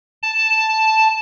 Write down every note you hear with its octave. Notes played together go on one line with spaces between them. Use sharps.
A5